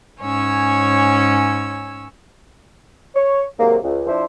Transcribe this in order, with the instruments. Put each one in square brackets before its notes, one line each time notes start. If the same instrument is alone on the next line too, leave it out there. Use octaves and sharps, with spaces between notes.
[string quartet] G#2 C#4 C#5 G#5 E6
[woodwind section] C#5
G#2 C3 D#3 F#3 A#3
C#2
F3 D4 E4 C5